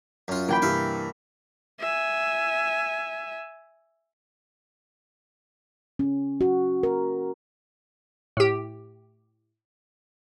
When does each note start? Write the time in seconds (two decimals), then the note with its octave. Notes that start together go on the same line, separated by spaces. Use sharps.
0.28 F#2 F4
0.48 E3 A#3 G5 B5
0.62 G2 C3 E3 E5 F5
1.80 E5 G#5
5.99 C#4
6.41 F#4
6.83 A#4
8.37 A2 G4